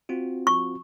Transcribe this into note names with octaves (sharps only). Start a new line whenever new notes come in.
C4 F4 F#4
C#6